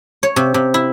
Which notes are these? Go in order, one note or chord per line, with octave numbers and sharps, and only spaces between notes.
C#5
C3
C3
E4